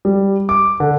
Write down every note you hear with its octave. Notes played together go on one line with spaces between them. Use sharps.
G3
D6
D3